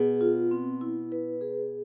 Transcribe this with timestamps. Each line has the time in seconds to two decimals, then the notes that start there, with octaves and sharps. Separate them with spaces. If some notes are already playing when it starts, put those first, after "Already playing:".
Already playing: B2 G#4
0.21 F4
0.51 C4
0.81 E4
1.12 B4
1.41 G#4